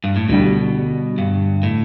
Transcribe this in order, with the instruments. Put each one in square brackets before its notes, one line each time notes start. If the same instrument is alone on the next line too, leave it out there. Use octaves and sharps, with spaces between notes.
[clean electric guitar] G2
A2
[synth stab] D2 D3 G3 [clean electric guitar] B2
[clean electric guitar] G2
A2